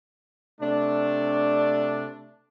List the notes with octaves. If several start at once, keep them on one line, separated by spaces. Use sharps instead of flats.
C3 A3 D4